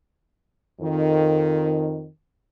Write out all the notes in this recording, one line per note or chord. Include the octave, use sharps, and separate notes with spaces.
F2 D#3